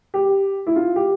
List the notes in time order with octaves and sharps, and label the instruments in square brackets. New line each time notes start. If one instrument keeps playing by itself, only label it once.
[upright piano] G4
E4
F4
G4